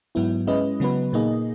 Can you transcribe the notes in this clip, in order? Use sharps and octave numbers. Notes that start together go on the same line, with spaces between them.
G#2 F#3 B3 E4
G#3 C#4 E4 B4 D#5
C#3 F#3 B3 F#4 B4
A#2 A#3 D#4 G#4 D#5